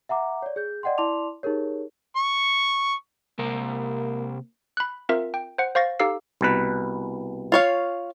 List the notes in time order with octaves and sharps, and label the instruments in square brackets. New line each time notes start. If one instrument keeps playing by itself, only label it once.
[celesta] E5 F#5 A#5 D6
C#5 D5
G#4 G6
D5 D#5 F#5 G5 C6
E4 D5 A5 C6 D6 F7
D#4 G4 G#4 A#4 C#5
[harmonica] C#6
[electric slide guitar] C3 A#4 [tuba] A#3
[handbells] B5 F#6
C4 F4 A#4 E5
G5
C5 F#5
C5 F5 C#6 A6 A#6
D#4 G4 A4 F5 E6 C7
[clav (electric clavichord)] C2 B2 B4
[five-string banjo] F4 C#5 F5